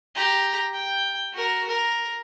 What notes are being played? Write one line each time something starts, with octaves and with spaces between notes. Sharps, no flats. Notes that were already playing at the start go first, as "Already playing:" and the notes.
G4 A#5
G5
F#4 A#4
A#4